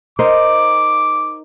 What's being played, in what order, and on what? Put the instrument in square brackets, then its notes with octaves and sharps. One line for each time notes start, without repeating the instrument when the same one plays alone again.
[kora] D#4 A#4 C5 [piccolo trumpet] D6